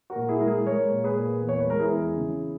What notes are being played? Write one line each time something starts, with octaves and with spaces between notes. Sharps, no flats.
F#4 A#4
A#2
E4 G#4
G#3 A#4
E4 G#4
G#3 A#4 C#5
A#2
G#4 B4
A#2
E2
C#5
B4
G#3 A#4
E4 G#4
E2
C#3